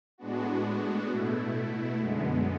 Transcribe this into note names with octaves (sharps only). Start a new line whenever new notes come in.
A2 G#3 B3 D4 F#4
B2 A3 E4
F#2 D3 G#3 B3